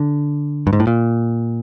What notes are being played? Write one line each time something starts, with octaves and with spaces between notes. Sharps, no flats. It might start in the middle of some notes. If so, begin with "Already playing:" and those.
Already playing: D3
G2
G#2
A2
A#2